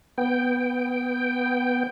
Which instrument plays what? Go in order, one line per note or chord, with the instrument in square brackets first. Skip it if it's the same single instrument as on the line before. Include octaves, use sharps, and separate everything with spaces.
[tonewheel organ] B3 G5